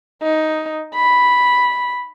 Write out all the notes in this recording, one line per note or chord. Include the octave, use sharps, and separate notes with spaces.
D#4
B5